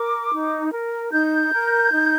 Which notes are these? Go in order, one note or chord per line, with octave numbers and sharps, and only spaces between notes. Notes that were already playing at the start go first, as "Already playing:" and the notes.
Already playing: A#4 D6
D#4
A#4
D#4 G6
A#4
D#4